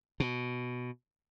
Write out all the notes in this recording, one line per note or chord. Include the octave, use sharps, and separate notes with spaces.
B2